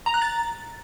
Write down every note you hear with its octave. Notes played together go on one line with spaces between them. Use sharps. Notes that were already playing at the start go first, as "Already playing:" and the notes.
A#5
F#6
A6